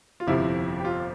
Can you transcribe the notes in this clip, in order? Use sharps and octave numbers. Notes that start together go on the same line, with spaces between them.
F4
G1 F2 C3 F3 E4
G4
F4